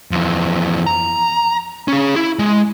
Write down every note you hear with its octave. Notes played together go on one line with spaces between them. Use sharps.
F2 E3
A#5
C#4 G#4
E4
G#3